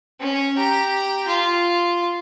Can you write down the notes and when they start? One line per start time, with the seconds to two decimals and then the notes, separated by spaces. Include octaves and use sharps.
0.20 C#4
0.57 G4 A#5
1.28 F4